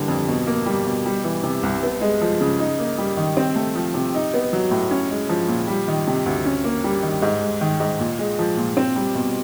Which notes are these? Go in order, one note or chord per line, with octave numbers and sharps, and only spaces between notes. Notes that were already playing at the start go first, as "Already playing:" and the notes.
Already playing: D3 E3 G3 A#3
F2
B2
A#3
G3
B2
G3
E3
C3
C2
B3
G#3
F3
C#3
D#4
A#3
G3
D#3
C4
A3
F3
C3
D#4
B3
F#3
A2
C#4
G#3
F3
A#2
G3
D#3
C3
D2
C#4
A#3
G3
D#3
G#2
G#3
D#3
G#2
A#2
G#3
F3
A#2
C4
G3
B2